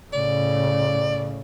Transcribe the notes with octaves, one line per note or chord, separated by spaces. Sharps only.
A2 C#3 D5